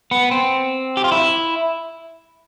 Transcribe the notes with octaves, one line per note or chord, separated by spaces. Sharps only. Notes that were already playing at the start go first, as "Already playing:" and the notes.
B3
C4
G4
F4
E4